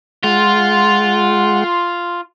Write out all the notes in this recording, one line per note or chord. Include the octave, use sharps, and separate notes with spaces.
G#3 F4 F#5